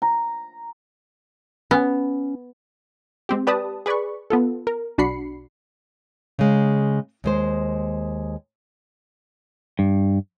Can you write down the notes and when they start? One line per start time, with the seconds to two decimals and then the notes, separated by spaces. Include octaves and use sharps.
0.02 A#5
1.71 B3 C#4
3.29 G#3 C4 G4
3.47 G4 B4 D5 A5 D#6
3.86 G#4 B4 D5 B5 C#6
4.30 B3 F4 A4
4.67 A#4
4.98 B1 D4 F#4 B5 C7 C#7
6.39 C#3 G#3
7.24 D#2 G#3 C5
9.79 G2